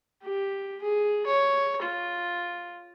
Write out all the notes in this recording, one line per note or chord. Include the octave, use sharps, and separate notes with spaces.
G4
G#4
C#5
F4